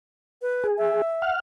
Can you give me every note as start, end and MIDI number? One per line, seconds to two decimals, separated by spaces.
0.42 0.66 71
0.64 1.02 68
0.78 1.34 76
1.22 1.40 78
1.22 1.40 89